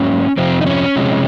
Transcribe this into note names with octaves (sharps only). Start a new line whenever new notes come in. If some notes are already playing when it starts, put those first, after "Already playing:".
Already playing: G#2 F#3 A#3 C#4
F2 C3 F3 C4
D#4
C#4
C3 F3 G#3